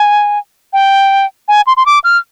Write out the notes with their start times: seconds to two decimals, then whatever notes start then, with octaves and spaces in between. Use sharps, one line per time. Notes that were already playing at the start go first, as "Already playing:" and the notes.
Already playing: G#5
0.73 G5
1.48 G#5
1.67 C6
1.77 C6
1.86 D6
2.04 F6